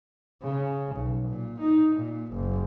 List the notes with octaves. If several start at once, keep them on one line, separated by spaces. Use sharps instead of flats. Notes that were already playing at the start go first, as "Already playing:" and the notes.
C#3
B1
A#2
D#4
A#2
F#1